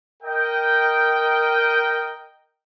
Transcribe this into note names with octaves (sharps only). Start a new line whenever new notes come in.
A#4 D#5 G5